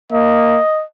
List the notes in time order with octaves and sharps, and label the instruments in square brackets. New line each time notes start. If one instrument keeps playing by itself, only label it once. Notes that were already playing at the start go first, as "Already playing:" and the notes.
[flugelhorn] A#3 [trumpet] D#5